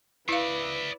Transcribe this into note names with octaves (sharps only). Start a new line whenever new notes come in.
E4 B4 D5 E5 F5